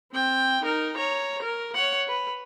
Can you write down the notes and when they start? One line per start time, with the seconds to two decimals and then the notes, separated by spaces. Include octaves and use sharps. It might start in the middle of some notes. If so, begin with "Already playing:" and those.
0.13 C4 G5
0.63 D#4 A#4
0.98 C#5 A#5
1.43 A#4
1.75 C#5 F#5
2.08 B4